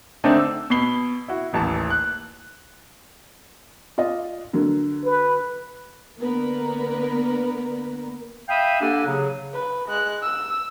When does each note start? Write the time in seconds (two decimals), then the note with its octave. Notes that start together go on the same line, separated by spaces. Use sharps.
0.24 D3 A3 C4 D4 D#4
0.39 E6
0.70 B2 B5 C7 G7
1.28 E4 F#4
1.53 D#1 A1 E3 A5
1.90 F#6
3.98 F4 D5 D#5
4.53 D3 F#3 A#4
5.04 B4
6.19 D3 A#3 B3 A#4 B4
8.49 E5 F5 G5 B5 D#6
8.81 A#3 D4 G4 A4 F#5 G#5
9.06 C#3 F#3
9.54 B4
9.89 G#3 F#6
10.23 E6